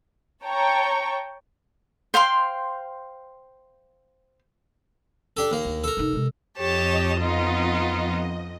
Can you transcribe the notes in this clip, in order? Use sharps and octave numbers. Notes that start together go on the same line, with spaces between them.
C#5 G5 A5 A#5 C#6
C5 F5 G5 C6
D4 G4 A4
D#2 A#3
D2
A4 A#4
F1 D#4
C3 G#3
F2 G4 C#5 D#5 A5
B3 D#4 F4